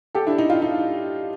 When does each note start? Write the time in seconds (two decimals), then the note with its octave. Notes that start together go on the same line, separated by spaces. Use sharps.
0.15 G4 A4
0.27 D4 E4
0.38 D#4
0.50 D#4 F4
0.62 D#4